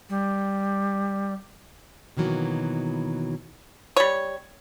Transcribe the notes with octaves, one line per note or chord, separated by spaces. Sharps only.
G3
B2 D#3 E3 F#3 A#3
G3 C#5